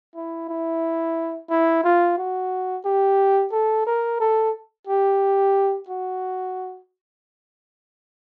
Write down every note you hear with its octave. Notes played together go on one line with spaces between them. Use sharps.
E4
E4
E4
F4
F#4
G4
A4
A#4
A4
G4
F#4